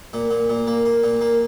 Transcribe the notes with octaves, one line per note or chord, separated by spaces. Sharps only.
A#2
A#2
A#2
A#3
A#3
A#2
A#3